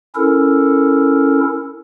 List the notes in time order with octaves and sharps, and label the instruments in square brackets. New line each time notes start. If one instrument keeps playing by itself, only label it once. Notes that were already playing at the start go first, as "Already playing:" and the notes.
[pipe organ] C#4 E4 A4 A#4